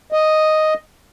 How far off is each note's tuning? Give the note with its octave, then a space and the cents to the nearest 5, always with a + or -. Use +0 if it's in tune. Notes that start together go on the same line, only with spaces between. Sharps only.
D#5 +0